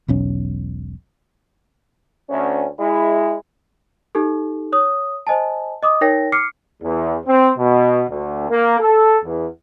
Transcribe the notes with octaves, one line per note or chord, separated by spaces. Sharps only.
E1 B1 C#4
D2 C#4
G#3 E4
D#4 G4 A4
C#5 D#6
C5 D#5 G#5 A5
D#5 D6 D#6
D#4 A#4 C#5 G5 A#6
D6 F6 C7 C#7
E2
C4
B2
D2
A#3
A4
E2